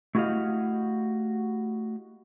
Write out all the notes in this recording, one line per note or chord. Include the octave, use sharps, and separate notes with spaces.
A3 E4 F#4 G4 D#5 F5